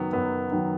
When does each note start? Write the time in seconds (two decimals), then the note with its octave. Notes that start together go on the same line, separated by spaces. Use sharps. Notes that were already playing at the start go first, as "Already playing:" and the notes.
Already playing: F#2 D#3 F#3 B3
0.13 F#2 B3
0.52 D#3 F#3